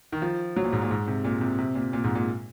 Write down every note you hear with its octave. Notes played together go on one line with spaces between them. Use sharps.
D#3
F3
F#3
A#2
G#2
A#2
G#2
C3
A#2
C3
C3
A#2
A#2
G#2
A#2